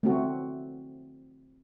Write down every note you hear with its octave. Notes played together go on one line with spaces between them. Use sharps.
A3 C4 F#4